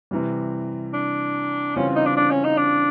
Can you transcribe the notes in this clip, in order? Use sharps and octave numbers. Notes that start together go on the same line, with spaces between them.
C3 E3 G3
D4
C#3 E3 G3 C4 C#4 F4
D#4
D4
D4
C#4
D#4
D4